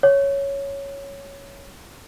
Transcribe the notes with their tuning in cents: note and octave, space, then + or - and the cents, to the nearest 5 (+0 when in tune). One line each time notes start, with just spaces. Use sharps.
C#5 +0